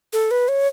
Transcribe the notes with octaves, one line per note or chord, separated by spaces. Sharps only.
A4
B4
C#5